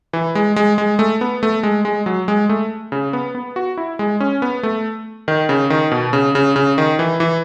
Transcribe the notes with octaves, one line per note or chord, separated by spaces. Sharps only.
E3
G#3
G#3
G#3
A3
B3
A3
G#3
G#3
F#3
G#3
A3
C#3
B3
B3
F#4
E4
G#3
C#4
B3
A3
D#3
C#3
D#3
B2
C#3
C#3
C#3
D#3
E3
E3